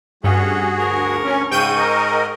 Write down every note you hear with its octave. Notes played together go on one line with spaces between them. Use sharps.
G2 G3 A3 C#4 F#4 G#4
D2 F3 A#4 C#6
C#4
G#2 C#3 G5 G6 D#7
A#4 D#5